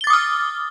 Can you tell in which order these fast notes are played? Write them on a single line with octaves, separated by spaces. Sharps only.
G7 A6 D6 D#6 F6